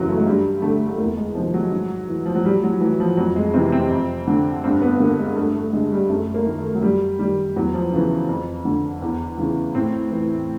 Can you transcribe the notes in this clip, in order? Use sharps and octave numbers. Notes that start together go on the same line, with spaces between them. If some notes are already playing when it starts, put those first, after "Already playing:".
Already playing: F#2 C#3 E3 F#3
A3
G#3
G2 G3
D3 A3
A3
E2 A#3
G#3
C3 D#3 F3
F#3
G#2
E3
F3
F#3
A2 G3
F#3
E3 F#3
F3
F2 F#3
G#3
C3 E3 C4
C4
F2
D3
G2 C4
B3
D3 A#3
G#3
G2 A3
A3
D3 G#3
G3
F#2 A3
A#3
D#3
A3
F#3
F#2 G3
D#3 G3
E2 F#3
F3
C#3 E3
F2
D3
E2
C#3 E3
A2 C4
E3